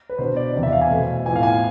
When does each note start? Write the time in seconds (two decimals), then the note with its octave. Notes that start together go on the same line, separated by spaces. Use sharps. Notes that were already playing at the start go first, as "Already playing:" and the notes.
0.10 B4
0.18 B2 B3 D4 C5
0.36 D5
0.55 E2 C3 E3 B3
0.63 E5
0.72 F5
0.81 G#5
0.91 B2 A3 C4
1.25 A2 F3 B3 G#5
1.36 F5
1.43 G#5